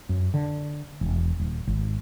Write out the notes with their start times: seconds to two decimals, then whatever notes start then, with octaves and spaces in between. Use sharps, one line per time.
0.09 F#2
0.34 D3
1.01 E1
1.40 D#1
1.67 G#1